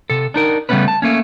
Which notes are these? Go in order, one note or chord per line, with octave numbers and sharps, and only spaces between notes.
C3 A4
D4 D#4 A#4
C#3 G3 A3 B3 C#4 B4
A5
A3 A#3 C#4